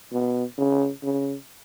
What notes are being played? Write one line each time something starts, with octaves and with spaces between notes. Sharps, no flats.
B2
C#3
C#3